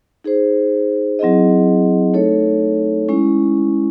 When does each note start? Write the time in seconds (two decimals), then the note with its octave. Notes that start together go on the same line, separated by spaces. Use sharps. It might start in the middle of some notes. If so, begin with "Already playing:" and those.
0.24 D#4 G#4 C5
1.19 F#3 C4 E4 G#4 D#5
2.14 A3 D#4 A4 C#5
3.09 G#3 C#4 E4